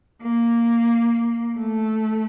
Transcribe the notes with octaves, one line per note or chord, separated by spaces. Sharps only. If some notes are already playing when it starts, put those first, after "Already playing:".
A#3
A3